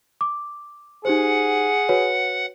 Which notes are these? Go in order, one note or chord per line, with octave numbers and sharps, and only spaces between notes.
D6
D#4 G4 G#4 C5 F#5
F#4 B4 C#5